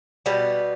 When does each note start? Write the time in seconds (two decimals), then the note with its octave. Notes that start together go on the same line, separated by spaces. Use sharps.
0.26 B2 G3 B3